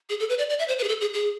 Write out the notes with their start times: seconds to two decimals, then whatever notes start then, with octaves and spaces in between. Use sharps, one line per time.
0.10 G#4
0.20 A4
0.29 B4
0.38 D5
0.49 D5
0.59 E5
0.68 C5
0.79 B4
0.84 G#4
0.88 A4
1.01 G#4
1.14 G#4